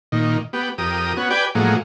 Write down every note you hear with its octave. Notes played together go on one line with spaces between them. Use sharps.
A#2 D#3
B3 G4
F2 G4 A#4 D#6
B3 C#4 F#4
G4 B4 D5 G5 G#5
A2 F3 F#3 G#3 A#3